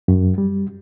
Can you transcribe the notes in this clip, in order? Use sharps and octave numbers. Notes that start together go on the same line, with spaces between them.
F#2
G3